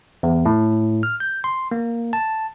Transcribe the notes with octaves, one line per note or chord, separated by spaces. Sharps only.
E2
A2
F6
G6
C6
A#3
A5